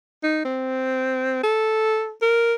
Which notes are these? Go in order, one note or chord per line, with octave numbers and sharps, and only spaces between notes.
D#4
C4
A4
A#4